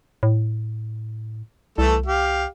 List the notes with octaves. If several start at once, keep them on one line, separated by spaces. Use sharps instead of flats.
A2
C2 E3 A3 A4
G4 F5